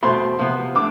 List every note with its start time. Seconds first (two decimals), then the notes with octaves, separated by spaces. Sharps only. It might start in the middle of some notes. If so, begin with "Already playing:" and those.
0.03 E2 B2 A3 C4 C6
0.39 C3 F3 B3
0.75 D3 A3 D6